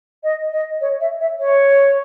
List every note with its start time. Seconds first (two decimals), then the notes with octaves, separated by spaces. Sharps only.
0.24 D#5
0.52 D#5
0.81 C#5
1.00 E5
1.20 E5
1.39 C#5